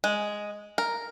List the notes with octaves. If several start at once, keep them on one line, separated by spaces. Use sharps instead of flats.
G#3
A#4